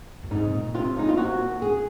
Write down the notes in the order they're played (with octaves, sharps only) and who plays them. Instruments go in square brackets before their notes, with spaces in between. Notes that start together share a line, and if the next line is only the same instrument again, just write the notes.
[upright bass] F#2
[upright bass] G#2 [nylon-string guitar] D#4
[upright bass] C3
A#2
[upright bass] C3 [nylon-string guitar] F4
[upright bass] C#3 [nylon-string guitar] D#4
[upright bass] A#2 [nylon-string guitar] F4
[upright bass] C3 [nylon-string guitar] F#4
[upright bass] A#2
[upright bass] G#2 [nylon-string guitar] G#4